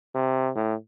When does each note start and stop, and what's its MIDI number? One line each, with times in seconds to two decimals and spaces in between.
0.15 0.50 48
0.56 0.74 45